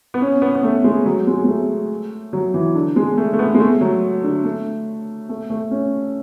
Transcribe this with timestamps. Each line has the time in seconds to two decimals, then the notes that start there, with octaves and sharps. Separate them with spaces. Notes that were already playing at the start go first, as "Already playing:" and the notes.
0.14 B3
0.22 C#4
0.42 B3
0.55 B3
0.63 A3
0.84 G#3
1.06 F#3
1.27 G#3
1.44 G#3
1.48 A3
2.33 F#3
2.54 E3
2.75 D3
2.96 G#3
3.17 A3
3.33 A3
3.39 B3
3.55 G#3
3.60 A3
3.81 F#3
4.24 D3
4.44 A3
5.29 A3
5.50 A3
5.71 C#4